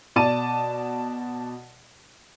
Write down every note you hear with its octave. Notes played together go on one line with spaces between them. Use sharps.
B2 D5 A5 D#7